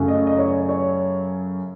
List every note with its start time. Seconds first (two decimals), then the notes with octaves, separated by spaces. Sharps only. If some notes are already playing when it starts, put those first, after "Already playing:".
Already playing: F#2 C#3 F#3 A3 C#4
0.08 D#5
0.27 D#5
0.39 C#5
0.69 C#5